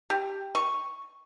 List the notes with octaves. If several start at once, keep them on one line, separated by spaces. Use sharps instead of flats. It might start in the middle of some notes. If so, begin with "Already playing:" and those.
G4
C#6